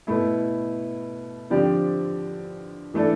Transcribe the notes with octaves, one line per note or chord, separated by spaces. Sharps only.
B2 A3 E4
D3 F3 C4 G4 D5
E3 A3 D4 A4